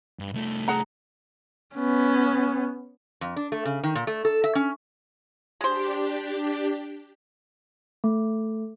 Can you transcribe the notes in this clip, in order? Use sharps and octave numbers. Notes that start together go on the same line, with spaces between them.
G2
C2 A3
G#4 F#5 A#5
B3 C#4
F2
D4
A3
C#3
D#3
A#2
A3
A4
E5
C#4
G#3 D4 G4 C5
A3